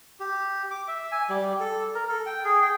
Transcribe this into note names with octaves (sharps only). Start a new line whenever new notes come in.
G4
D6
E5
G#5
G3
A4
A#4
A4
G5
G#4
G5